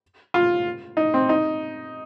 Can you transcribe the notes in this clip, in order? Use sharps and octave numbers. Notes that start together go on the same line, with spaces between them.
F4
D#4
C4
D#4